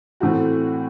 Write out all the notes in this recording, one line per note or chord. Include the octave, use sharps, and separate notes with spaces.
A2 E3 A3 C4 F#4